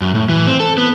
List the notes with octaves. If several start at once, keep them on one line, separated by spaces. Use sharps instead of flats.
F#2
A2
E3
C4
A4
B3